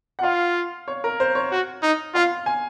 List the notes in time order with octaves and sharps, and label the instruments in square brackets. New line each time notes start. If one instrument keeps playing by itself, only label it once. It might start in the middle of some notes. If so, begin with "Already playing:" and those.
[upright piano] F#5
[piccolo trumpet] F4 [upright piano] F5
[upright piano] C#5
A#4
C5
C#5
[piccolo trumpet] F#4
D#4
[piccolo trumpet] F4 [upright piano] F5
[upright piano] G#5